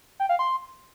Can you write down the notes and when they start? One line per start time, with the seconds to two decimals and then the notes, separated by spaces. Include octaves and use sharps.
0.20 G5
0.29 F5
0.39 C6